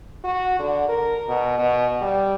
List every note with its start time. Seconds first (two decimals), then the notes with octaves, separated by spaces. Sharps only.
0.24 F#4
0.59 D3
0.89 A#4
1.28 B2
1.59 B2
2.01 G3